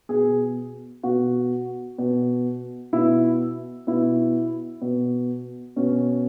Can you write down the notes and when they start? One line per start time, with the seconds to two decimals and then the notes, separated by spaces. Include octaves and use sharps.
0.09 B2 G#4
1.03 B2 F#4
1.98 B2
2.93 B2 E4
3.87 B2 E4
4.82 B2
5.76 B2 C#4